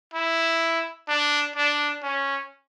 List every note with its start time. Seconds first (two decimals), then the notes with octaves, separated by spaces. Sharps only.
0.14 E4
1.08 D4
1.56 D4
2.03 C#4